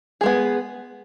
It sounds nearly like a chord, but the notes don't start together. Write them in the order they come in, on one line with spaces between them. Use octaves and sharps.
G#4 G#3 B3